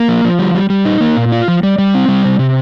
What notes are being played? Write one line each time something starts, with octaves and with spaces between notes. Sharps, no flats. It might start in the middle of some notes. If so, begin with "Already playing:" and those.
Already playing: A#3
F3
F3
G3
G3
G3
D#4
A#3
A#2
F4
F3
G3
G3
C4
G3
C3
C3